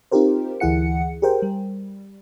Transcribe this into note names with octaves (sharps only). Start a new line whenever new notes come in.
C4 D#4 F4 G4 A#4 C5
D2 E3 E4 G#4 F#5 C#7
G4 G#4 A#4 C5 G5
G3